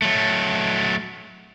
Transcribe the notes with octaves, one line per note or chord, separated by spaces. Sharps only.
F#3 A3